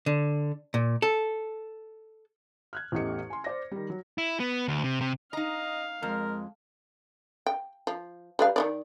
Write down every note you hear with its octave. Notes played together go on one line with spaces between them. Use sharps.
D3
A#2
A4
F6 F#6 G#6
A1 E2 A3 G4 D#5 C#7
G#5 C6
C5 D5 A#6
D#3 G3
F#3
E4
B3
D2
C3
C3
D#4 D#5 F5 A#5
F2 G#3 A#4
G5
F3
G3 B4 F5
D#3 E3 D5